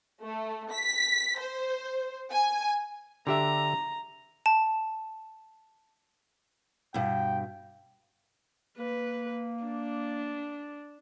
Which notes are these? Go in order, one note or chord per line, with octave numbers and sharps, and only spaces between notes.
A3
B6
C5
G#5
D3 G4 E5 A#5
A5
G2 B2 G5
A#3 B4
D4